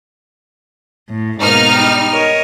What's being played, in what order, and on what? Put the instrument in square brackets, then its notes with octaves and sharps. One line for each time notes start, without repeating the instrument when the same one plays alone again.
[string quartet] A2
[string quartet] G#2 B2 A#3 [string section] D#4 F6
[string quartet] G3
A#4 C#5 D#5